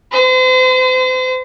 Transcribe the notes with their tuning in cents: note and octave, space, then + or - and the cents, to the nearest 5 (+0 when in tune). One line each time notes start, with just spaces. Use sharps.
C5 -35